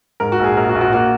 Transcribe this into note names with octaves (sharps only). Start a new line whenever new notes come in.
G#2 A#4
F#4
A#1
G#4
A#1 A#4
F#4
A#1
F#4
A#3 F#4